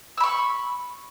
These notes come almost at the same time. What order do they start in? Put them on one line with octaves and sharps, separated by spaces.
E6 B5 C#6